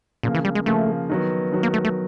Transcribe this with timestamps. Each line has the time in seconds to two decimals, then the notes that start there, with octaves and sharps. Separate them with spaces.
0.23 A#2 C#3 F3 A#3
0.35 E3
0.45 G3
0.55 G#3
0.66 C#3 F3 A3 A#3
1.10 D#3 F#3 B3
1.52 D#3 F#3 B3
1.63 A#3
1.74 A3
1.84 A3